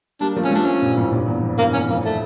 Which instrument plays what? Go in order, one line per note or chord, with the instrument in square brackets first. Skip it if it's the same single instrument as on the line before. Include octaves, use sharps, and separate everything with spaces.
[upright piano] G3 A#3 [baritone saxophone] D4
[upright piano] F3 A3
[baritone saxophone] C#4
[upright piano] F3 A3 [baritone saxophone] D4
[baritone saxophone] C#4
[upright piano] G2 A#2
F2 A2
G2 A#2
E2
F2
[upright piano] E2 G2 [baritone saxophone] A#3
[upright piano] E2 [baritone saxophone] C#4
[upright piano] F2 [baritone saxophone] A#3
[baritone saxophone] A3